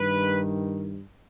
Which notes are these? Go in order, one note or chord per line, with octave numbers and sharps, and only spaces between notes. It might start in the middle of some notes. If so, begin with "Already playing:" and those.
Already playing: G2 D#3 B4